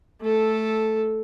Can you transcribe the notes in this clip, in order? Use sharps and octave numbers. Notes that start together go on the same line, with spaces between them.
A3 A4